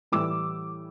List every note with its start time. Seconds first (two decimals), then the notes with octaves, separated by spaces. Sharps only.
0.12 A2 E3 G3 D6 E6